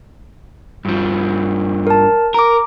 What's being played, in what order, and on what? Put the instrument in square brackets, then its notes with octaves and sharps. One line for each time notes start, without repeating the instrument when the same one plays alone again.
[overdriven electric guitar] G2 F3
[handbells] A#4 A5
[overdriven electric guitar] A#4 [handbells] A#5 D6